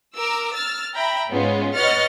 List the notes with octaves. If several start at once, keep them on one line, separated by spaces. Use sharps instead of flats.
A#4 D6 E6
E6 F6 A6
E5 G5 A#5 B5
G#2 G#3 B3 C#4 F4
B4 C#5 D#5 F#5 F6 A6